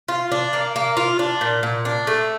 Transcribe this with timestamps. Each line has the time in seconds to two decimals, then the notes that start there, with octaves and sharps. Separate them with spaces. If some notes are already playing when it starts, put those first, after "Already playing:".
0.08 F4
0.32 D4
0.53 A#3
0.76 A#3
0.97 F4
1.19 D4
1.41 A#2
1.63 A#2
1.85 D4
2.07 A3